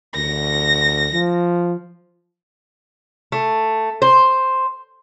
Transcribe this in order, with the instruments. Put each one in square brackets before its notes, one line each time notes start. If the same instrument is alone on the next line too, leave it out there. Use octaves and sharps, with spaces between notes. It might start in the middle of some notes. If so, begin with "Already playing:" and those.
[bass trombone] D2 [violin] A#6
[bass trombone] F3
[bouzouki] A3
C5